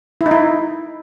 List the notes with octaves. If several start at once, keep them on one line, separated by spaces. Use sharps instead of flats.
E4
D#4
E4